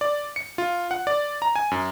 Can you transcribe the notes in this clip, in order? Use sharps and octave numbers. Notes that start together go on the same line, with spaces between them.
D5
C#7
F4
F#5
D5
A#5
G#5
F#2